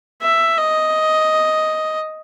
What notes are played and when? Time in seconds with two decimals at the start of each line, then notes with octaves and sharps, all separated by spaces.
0.22 E5
0.58 D#5